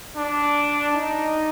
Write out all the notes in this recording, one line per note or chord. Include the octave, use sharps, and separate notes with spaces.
D4
D#4